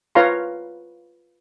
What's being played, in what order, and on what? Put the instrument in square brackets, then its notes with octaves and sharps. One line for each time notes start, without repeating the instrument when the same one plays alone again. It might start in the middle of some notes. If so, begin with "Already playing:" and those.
[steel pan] F4 B4 C#5 F5 A#5 C6